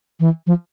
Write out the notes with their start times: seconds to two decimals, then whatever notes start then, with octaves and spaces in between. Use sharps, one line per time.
0.20 E3
0.47 F3